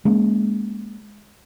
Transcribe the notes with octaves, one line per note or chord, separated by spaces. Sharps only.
G#3 A#3 C#4